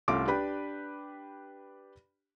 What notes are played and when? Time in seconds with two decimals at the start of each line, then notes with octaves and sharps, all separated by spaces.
0.08 C2 A3 C#4 F4 D6 D7
0.27 D4 G4 B4 B5